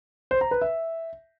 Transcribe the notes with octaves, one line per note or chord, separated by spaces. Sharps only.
C5
A#5
B4
E5